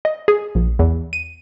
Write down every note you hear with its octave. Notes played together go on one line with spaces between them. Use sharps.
D#5
G#4
A#1
E2
D#7